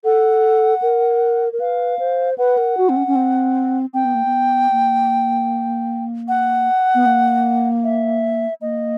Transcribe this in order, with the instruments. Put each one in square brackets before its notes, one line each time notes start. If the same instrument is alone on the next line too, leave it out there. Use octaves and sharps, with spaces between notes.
[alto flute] A4 [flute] F#5
[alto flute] A#4
A#4
[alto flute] B4 [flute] F5
[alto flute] C5
[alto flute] B4 [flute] F#5
[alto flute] A#4
F#4
C4
C#4
C#4
C4
[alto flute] C4 [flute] G5
[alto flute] B3
A#3
B3
A#3
[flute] F#5
[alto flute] B3
A#3
[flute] E5
[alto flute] A#3 [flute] D#5